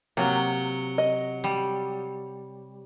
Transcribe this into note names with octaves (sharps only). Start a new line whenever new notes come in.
C3 F#3 A#3
D#5
G3